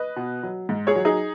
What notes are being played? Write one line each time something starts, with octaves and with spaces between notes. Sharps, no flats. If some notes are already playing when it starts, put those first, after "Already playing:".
Already playing: B4 D#5
B2
F#3
G#2
G#4 C#5
F#3
D#4 G#4